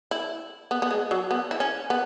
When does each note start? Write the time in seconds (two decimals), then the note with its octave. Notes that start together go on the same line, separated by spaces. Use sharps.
0.11 E4
0.71 B3
0.82 B3
0.91 G#3
1.11 F#3
1.31 B3
1.51 E4
1.60 C#4
1.90 B3